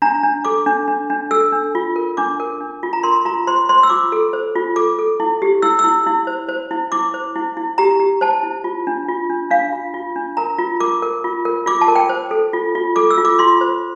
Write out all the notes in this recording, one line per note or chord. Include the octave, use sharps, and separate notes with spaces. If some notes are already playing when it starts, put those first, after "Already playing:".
D4 A#5
D4
A4 D6
D4
D4
D4
A4 E6
D4
F4
A#4
D4 D6
A#4
D4
F4
A#5
A#4 C6
F4 A#5
C5 C6
C5 C6
E6
F4 D6
A4
C5
F4
A4 D6
A4
E4
G4
E4 E6
E4 E6
E4
C5
C5
E4
E4 D6
C5
E4
E4
G4 A#5
G4
C5 A5
E4
F4
D4
F4
D4
D4 F5
F4
F4
D4
A#4 A#5
F4
A#4 D6
A#4
F4
A#4
F4 D6
A5
A#4
G5
C5
A4
F4
F4
A4 D6
E6
F4
D6
F4 C6
C5